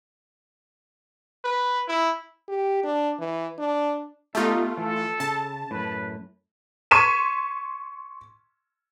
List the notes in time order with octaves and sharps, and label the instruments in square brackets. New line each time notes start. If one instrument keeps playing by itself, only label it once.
[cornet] B4
E4
[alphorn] G4
D4
E3
D4
[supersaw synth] A3 F4 [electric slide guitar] B3 G4 A4 [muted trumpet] D#4
[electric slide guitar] E3 [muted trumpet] A4
[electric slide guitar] C#3 [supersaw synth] A5
[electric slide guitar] F#2 A2 [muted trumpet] B4
[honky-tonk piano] C6 C#6 G#6 B6 D#7 E7